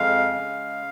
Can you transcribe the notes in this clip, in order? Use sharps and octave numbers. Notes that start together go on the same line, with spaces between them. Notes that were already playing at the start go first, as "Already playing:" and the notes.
Already playing: F2 G#3 F5
C#3